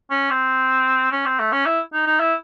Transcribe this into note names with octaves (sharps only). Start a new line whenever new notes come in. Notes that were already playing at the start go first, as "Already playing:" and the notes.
C#4
C4
C#4
C4
A3
C#4
E4
D#4
D#4
E4